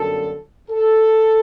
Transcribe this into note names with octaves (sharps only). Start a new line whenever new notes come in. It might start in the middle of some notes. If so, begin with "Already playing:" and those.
Already playing: G1 F#2 D3 F#3 A4
A4